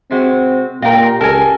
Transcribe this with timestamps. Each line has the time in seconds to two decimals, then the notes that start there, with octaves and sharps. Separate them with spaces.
0.11 C3 G#3 C4 F#4
0.82 A#2 F4 G4 A#4 D#5 F5 G5
1.21 C#2 A4 A#4 D5 G#5